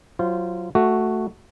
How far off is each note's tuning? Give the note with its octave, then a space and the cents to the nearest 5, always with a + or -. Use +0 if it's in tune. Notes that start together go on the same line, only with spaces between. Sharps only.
F#3 +0 F4 -20 C5 +0
A3 +0 F#4 +0